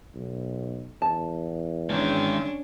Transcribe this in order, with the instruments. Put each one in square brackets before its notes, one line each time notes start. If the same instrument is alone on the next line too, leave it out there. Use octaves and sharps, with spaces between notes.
[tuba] B1
[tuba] E2 [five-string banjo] A5
[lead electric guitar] D#3 G#3 [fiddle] C#4 D4